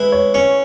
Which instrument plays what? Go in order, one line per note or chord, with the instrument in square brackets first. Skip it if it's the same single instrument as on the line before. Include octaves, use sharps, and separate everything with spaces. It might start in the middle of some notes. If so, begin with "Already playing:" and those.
Already playing: [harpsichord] G#3 E4 [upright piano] B4
[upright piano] C#5
[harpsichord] C#4 [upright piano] C#5